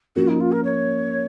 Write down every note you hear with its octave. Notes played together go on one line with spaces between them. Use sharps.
F3 A#3 C#4 F#4
D#4
F4
A#4
C#5